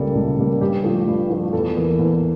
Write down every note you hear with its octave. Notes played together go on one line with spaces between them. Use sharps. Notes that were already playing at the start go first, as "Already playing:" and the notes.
Already playing: C#2 C#3 G3 A#3 A4
C#2
C#3 G3 A#3
G2 G4
F3 A3
G2
F3 A3
E2 A4
E3 A#3
E2